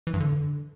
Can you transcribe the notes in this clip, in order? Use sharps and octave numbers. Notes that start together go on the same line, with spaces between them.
E3
G2
D3